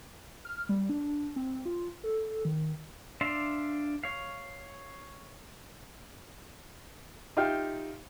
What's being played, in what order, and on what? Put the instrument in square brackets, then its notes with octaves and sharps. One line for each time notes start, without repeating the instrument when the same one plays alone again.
[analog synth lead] F6
G3
D4
C4
F4
A4
D#3
[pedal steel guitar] D4 D5 E5 F5 C6
C#5 F5
[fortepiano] D#4 F4 G4 E5 F5 G5